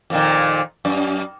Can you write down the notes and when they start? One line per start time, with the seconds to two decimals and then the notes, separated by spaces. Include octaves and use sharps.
0.10 F2 A#2 D#3
0.85 F#2